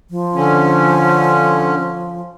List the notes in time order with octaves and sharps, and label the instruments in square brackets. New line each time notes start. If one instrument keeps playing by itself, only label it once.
[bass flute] F3
[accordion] D3 C#4